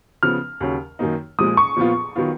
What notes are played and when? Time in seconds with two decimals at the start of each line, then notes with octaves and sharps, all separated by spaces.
0.23 C#3 F3 B3 F6
0.60 D#2 C#3 F#3 C#4
0.99 F#2 D#3 A#3 D#4
1.39 A#2 F3 G#3 D#6
1.57 C#6
1.76 A#2 F3 B3 F4
2.16 D#3 F#3 B3 F4